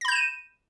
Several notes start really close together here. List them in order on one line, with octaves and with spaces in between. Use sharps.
A#6 B5 G6 E7 D#7